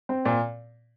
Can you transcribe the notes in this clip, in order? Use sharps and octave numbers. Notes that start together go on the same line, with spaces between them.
C4
A#2